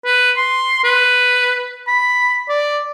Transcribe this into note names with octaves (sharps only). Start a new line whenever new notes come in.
B4
C6
B4
B5
D5